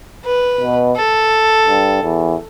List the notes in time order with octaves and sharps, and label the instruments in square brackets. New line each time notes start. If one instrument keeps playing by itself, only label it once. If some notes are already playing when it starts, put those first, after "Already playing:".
[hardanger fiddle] B4
[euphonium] B2
[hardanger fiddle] A4
[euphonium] G2
E2